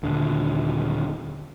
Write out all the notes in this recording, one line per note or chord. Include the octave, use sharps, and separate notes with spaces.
D#1 D3